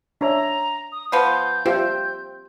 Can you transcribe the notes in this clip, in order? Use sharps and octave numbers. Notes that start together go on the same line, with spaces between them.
D4 C#5 E5 A#5
D#6
F3 B3 F4 G6
C4 F4 G4 E5